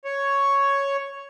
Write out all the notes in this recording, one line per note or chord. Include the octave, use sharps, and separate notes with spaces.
C#5